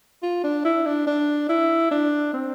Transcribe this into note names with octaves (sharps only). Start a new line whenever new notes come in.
F4
D4
E4
D4
D4
E4
D4
C4